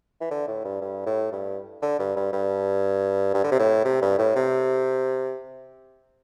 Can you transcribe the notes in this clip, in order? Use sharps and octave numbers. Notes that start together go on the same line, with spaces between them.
E3
D3
A2
G2
G2
A2
G2
D3
G2
G2
G2
G2
D3
C3
A2
C3
G2
A2
C3